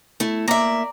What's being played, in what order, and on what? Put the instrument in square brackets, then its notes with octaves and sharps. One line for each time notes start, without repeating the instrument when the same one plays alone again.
[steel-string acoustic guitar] A3 E4
[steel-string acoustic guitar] A#3 E5 [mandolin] D5 A#5